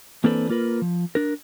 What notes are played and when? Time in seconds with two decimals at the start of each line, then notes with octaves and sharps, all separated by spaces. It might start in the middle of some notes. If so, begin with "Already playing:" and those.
0.24 E3 A#3 C4 D4 A4 B4
0.50 A#3 F4 A#4 B4
0.82 F3
1.15 D4 A#4